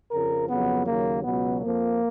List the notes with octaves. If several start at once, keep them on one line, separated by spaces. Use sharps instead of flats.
F2 C#3 F3 A#4
F2 C#3 F#3 B3
D#2 C#3 F#3 A#3
C#2 B2 F#3 B3
F2 F3 A#3